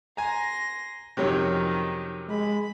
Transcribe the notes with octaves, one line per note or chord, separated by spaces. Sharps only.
G#5 A#5 C6 A#6
F2 C3 D#3 F#3 C#4
G#3 B5